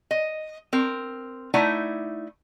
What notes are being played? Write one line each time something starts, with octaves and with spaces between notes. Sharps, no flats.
D#5
C4 A#4
A3 D#4 E4 D5 F#5